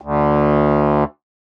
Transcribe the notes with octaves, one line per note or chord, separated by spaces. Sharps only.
D2